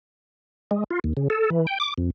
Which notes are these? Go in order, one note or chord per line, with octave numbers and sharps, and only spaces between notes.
G#3
F4
D#2
C#3
A4
E3
G5
D6
F2